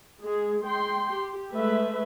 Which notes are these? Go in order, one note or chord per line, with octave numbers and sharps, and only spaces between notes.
G#3 G#4
G#3 G5 C6
G4
G#3 A3 B4 E5